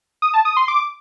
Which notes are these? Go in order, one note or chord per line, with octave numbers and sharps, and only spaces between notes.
D#6
A5
D#6
C6
D6